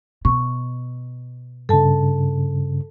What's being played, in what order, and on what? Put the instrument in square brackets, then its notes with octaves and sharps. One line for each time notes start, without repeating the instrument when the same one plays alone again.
[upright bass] B2 [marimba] C#6
[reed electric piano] G2 C#3 [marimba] A4 A5